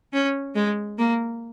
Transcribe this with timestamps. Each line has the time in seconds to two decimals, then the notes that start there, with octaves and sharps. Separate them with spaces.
0.13 C#4
0.55 G#3
0.98 A#3